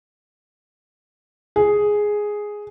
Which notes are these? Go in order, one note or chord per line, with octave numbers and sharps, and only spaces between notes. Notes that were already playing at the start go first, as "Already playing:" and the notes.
G#4